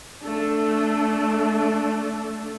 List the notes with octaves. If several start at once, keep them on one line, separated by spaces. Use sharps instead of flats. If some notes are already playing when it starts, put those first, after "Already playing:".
A3 D4